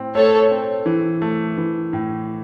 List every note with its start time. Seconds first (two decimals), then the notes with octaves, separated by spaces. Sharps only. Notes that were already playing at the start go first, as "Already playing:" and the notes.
Already playing: A2 C4
0.15 A3 A4 C#5
0.51 C4
0.86 E3
1.22 A3
1.58 E3
1.93 A2